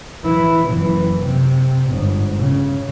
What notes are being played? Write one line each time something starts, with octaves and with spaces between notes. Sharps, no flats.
E3 E4
F#1 E3
C3
G1 G#2
C#3